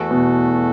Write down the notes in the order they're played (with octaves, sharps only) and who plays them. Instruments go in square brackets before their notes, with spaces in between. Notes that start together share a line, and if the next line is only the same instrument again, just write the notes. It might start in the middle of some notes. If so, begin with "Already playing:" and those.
Already playing: [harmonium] E2 E3 A3 F#4 A4
[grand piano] B2